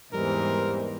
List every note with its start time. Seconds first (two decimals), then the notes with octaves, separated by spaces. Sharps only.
0.14 E2 G#2 E3 G3 C4 A#4 C5